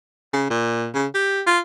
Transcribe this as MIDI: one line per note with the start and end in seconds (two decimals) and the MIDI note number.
0.33 0.49 49
0.50 0.88 46
0.94 1.07 49
1.14 1.41 67
1.47 1.59 65